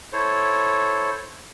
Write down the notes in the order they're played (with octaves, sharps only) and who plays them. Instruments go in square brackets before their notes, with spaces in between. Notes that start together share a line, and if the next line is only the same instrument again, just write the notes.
[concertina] E4 A4 C5 C#5